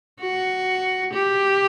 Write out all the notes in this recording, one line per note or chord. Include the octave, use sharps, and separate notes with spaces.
F#4
G4